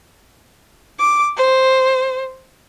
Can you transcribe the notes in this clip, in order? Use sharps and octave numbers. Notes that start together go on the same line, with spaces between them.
D6
C5